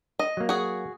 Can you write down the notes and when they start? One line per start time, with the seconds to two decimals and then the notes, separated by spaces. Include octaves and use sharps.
0.19 D#5
0.37 F#3 A#3
0.49 F#4 G#4